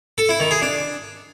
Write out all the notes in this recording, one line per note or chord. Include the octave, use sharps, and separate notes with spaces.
A4
E4
D#3
G#4
D4